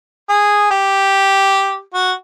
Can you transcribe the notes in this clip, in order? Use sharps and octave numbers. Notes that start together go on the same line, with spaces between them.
G#4
G4
F#4